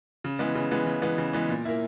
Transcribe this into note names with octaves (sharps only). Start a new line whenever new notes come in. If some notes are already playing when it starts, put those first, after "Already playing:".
C#3
E3 G#3 B3
C#3
E3 G#3 B3
C#3
E3 G#3 B3
C#3
E3 G#3 B3
A#2
A#3 E4